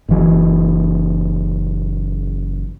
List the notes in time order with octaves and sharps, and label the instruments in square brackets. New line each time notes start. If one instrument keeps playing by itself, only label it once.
[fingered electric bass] F#1 E3